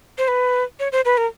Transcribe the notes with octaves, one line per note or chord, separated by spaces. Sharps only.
C5
B4
C#5
C5
B4
A#4